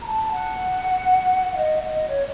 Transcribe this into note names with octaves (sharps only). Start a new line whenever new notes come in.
A#5
A5
F#5
F5
D#5
D#5
C#5